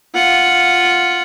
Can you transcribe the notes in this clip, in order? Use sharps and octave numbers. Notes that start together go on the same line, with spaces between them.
F4 F#5